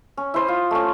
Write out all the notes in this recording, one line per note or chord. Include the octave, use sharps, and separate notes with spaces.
C#4
E4 C5 D#6
F4
A3 C#4